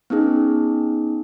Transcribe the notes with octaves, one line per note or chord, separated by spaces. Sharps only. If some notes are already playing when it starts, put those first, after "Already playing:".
B3 C#4 D#4 G#4